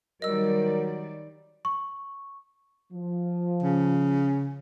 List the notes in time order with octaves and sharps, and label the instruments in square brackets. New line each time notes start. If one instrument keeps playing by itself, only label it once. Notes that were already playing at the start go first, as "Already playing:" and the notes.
[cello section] D#3 G3 D5 [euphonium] F#3 [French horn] A#4 [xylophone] D#5 E6
[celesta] C#6
[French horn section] F3
[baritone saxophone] C#3